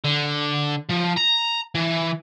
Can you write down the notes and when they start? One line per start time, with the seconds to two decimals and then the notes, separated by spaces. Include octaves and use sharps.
0.04 D3
0.90 F3
1.17 A#5
1.75 E3